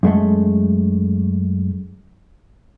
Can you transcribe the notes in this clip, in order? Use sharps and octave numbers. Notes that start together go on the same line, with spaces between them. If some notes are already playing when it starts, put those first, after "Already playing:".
F#2 G#3 A3